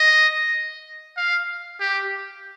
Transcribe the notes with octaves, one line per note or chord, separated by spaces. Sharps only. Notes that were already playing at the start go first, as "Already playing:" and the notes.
Already playing: D#5
F5
G4